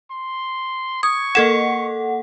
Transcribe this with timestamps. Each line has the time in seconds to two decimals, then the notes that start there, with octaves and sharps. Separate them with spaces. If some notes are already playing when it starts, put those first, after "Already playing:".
0.11 C6
1.03 C#6 D#6 G#6
1.35 A#3 A4 A#4 F#5 G#6 E7